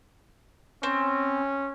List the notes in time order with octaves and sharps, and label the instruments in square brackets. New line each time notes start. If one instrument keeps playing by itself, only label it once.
[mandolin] C4 [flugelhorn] C#4